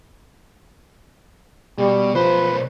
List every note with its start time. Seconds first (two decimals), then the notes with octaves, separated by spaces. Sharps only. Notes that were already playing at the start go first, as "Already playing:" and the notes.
1.78 B2 G3
2.15 B1 F3 B4 C5